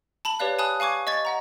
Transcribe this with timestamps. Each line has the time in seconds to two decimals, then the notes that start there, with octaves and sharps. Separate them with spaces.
0.25 A5 B5 F#7
0.39 G4 B4 C#5 D5 F5 F#6
0.59 G#5 A5 B5 D#6 F#6
0.80 F5 G#5 C#6 D6 G#6
1.07 D#5 C#6 G#6 A6
1.25 D#5 F#5 A#5